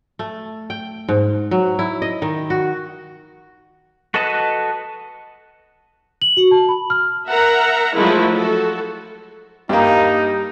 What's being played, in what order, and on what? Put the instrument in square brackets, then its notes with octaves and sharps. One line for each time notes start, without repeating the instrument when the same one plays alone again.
[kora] A3
G5
G#2
F#3
E4
D#5
D#3
F#4
[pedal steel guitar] F#4 A4 B4 D#5 A5
[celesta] F#7
F#4
A5
B5
F6
[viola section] A#4 E5 F#5 A#5
F3 F#3 G#3 A3 E4 F4
F#4 A4
[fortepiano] G2 A#3 [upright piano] G3 G4 [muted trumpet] D#4